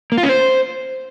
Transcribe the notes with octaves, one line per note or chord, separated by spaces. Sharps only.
A#3
F4
C#4
C5